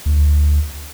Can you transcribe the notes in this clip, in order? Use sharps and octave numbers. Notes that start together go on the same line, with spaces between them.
D2